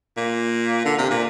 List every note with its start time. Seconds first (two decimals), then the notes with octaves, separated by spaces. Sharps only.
0.17 A#2
0.85 D3
0.98 C3
1.11 A#2